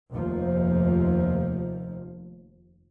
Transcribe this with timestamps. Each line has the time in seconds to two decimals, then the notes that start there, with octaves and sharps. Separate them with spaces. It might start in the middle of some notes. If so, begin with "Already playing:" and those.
0.11 F1 D#2 F3